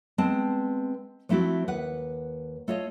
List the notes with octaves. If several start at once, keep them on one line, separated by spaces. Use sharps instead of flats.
G#3 B3 C4 A5
F3 A3 C4 E4 F#4
D#2 B4 F#5
A3 F4 C#5 D#5